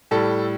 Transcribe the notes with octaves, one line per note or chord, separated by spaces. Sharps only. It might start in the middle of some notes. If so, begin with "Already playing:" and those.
A2 G3 A4